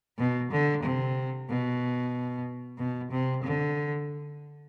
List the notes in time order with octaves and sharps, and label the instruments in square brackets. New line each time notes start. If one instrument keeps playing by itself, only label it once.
[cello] B2
D3
C3
B2
B2
C3
D3